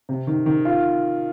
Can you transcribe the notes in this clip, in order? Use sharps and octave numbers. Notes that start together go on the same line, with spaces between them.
C3
D#3
D#3
F4